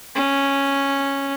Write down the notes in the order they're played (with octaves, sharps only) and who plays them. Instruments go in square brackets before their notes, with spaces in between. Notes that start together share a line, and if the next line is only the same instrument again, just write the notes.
[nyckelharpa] C#4